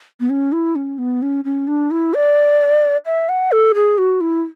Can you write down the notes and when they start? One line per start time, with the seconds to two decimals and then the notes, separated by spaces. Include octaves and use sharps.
0.20 B3
0.30 C#4
0.52 E4
0.76 C#4
0.98 B3
1.22 C#4
1.45 C#4
1.67 D4
1.91 E4
2.14 D5
3.06 E5
3.29 F#5
3.52 A4
3.74 G#4
3.98 F#4
4.21 E4